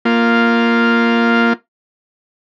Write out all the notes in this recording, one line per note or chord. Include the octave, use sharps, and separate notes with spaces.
A#3 F4